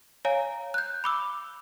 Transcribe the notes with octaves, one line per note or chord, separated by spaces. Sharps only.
C#5 F5 G#5 A#5
F#6 G6
B5 D6 E6